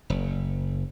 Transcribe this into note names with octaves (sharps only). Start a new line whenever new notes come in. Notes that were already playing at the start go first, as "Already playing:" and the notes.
F#1